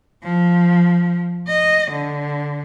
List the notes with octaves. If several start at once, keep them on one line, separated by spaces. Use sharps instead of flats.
F3
D#5
D3